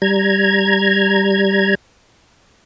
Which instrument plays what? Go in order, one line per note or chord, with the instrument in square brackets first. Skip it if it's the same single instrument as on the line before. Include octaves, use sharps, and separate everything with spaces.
[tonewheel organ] G3 A#5 G#6